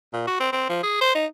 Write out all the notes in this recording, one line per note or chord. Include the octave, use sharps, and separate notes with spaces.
A#2
F#4
C4
C4
F3
G#4
C5
D#4